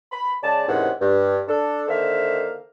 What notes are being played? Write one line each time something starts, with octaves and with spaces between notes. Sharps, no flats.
B5
C#3 G#3 D5 A5
G#2 C3 D#3 E3 C#4 F#5
G2
D4 A4
D3 D#3 A#3 C5 E5 F5